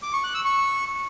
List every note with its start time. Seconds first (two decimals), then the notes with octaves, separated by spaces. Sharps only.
0.03 D6
0.13 C#6
0.24 F#6
0.34 E6
0.45 C#6